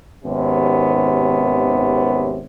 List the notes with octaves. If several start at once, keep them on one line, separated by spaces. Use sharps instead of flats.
G#1 D#2 C3 B3 C#4